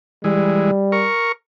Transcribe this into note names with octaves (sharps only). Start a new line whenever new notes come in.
E3 G3 G#3
A#4 C#6